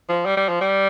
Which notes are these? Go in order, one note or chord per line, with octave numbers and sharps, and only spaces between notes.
F3
G3
G3
F3
G3